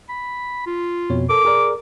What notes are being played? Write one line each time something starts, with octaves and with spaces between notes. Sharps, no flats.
B5
F4
F2 B2 C#5
A4 A#4 D6
G#4 A#4 D5